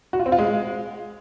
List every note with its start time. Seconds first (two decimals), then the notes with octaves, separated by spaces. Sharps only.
0.13 F#4
0.20 F4
0.26 C4
0.32 F4
0.39 G#3